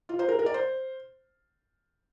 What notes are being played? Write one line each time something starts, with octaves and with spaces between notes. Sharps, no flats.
F4
C5
A#4
A#4
D5
C5